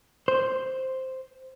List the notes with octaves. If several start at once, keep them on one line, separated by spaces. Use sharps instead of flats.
C5